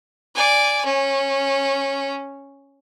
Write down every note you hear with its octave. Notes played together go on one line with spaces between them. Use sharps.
D5 G#5
C#4